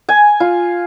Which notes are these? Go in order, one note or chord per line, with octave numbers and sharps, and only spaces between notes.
G#5
F4